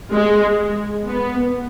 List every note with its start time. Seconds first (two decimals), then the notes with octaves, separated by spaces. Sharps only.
0.12 G#3
1.07 B3